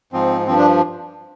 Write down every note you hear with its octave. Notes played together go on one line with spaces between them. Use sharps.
G#2 F3 C4
G2 F3 C4
D4